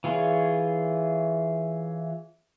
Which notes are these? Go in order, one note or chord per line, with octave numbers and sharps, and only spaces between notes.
E3 F4 G#4 C#5